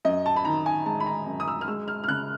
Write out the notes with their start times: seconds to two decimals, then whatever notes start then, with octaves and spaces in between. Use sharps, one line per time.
0.05 F#2 D#5
0.26 A5
0.36 B5
0.45 D#3 A#5
0.66 G#5
0.86 G#3 A5
1.00 B5
1.06 A#5
1.26 F#2
1.40 D#6
1.48 E6
1.61 F6
1.68 G#3 E6
1.88 F6
2.04 F6
2.08 C#3 F#6